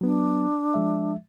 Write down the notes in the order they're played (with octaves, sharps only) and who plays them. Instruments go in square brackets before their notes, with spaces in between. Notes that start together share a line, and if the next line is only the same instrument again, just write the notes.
[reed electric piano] F#3 B3 [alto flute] D4
[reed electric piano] F3 G#3 E5